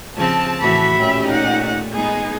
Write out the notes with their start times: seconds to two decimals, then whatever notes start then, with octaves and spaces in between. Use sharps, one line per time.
0.17 C#3 F3 C4 A5
0.61 A2 E3 F#4 E5 B5
0.98 A#2 A3 C#4 G4
1.27 D#4 F#5
1.93 G#3 B3 D#4 G#4